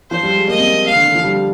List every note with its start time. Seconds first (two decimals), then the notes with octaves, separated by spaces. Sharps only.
0.10 F3 C5
0.23 G3
0.35 G#3
0.48 A#3 D#5
0.59 C4
0.67 A#3
0.86 F5
0.95 D3
1.06 D3
1.15 F3
1.24 G3